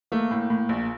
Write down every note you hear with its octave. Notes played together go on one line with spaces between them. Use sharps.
A3 A#3
A2
A2
A#1